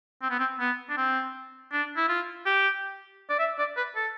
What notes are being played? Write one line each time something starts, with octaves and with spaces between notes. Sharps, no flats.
C4
B3
C4
B3
D4
C4
D4
E4
F4
G4
D5
E5
D5
B4
A4